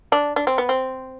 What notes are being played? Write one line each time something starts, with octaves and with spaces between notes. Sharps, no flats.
D4
D4
C4
B3
C4